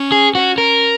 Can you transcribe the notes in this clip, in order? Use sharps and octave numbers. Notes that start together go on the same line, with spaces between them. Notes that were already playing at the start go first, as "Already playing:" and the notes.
Already playing: C#4
G#4
C#4 F#4
A#4